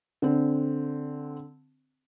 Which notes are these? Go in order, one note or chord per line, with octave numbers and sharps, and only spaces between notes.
D3 C4